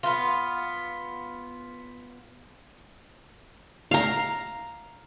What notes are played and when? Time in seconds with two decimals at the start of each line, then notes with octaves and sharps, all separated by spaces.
0.03 B3 F4
3.91 F5 A#5